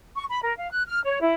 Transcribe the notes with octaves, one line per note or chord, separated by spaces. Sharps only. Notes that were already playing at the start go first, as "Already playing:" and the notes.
C#6
B5
A#4
F5
F#6
F6
C#5
E4